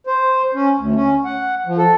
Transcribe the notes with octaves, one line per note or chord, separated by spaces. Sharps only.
C5
C#4
D2
C#4
F#5
F3
A4